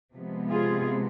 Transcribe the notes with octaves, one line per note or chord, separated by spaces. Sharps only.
C3 F3 G#3 B3
F4 G#4